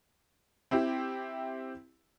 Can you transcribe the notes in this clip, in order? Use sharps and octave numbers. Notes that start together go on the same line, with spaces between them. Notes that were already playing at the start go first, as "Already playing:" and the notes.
C4 E4 G4